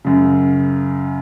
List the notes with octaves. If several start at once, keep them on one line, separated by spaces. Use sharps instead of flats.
F#2 C#3